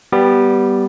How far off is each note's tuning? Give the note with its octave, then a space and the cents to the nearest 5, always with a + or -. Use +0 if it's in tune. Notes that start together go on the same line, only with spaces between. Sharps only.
G3 -5 B3 +0 D6 +40